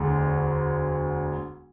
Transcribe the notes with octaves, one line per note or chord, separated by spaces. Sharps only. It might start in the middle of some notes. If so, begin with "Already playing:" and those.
Already playing: E1 D2 D3